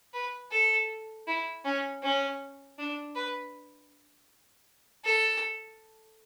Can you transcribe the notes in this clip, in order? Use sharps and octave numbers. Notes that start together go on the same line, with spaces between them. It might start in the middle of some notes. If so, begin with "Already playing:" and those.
B4
A4
E4
C#4
C#4
D4
B4
A4